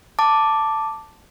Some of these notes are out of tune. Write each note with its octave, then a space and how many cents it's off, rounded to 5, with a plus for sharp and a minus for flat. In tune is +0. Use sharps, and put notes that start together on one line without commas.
A5 +5 D6 +0